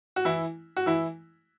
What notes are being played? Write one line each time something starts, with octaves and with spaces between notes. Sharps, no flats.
F#4
E3 E4
F#4
E3 E4